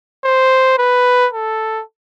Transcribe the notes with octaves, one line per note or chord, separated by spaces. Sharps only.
C5
B4
A4